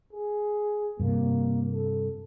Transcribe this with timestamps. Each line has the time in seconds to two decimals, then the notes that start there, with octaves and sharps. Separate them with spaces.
0.13 G#4
1.00 G2 C3 A#3
1.74 A4